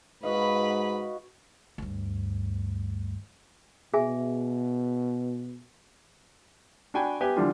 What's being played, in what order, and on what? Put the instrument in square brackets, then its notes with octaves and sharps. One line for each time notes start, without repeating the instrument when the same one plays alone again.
[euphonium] G#2 [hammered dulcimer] F#4 D#5 F5 [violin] B4 B5
[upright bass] D2 G2
[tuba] B2 [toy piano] G#4 E5 G#5
[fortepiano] D4 F#4 G5 G#5 B5
B3 G4 B4 E5 G#5
D3 E3 F3 G3 D4 F4